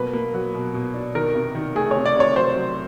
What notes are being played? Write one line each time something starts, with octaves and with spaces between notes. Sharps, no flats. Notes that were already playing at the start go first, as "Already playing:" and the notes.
Already playing: B2 F#3 A#3 B4
A#3
F#3
B2
B2
D4
D#3 A#4
C3
D#3
A3 G#4
C#5
C3
D5
C3 C#5
F#3 C5
F#3